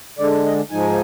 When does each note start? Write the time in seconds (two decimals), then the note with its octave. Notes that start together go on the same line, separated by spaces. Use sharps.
0.19 D3 G#3 D4 D5
0.45 D#5
0.71 G#2 F3 G#3 D#4 G#5